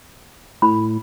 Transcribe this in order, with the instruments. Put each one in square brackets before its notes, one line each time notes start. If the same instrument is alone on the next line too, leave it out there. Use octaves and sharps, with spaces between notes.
[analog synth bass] A2 [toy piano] B5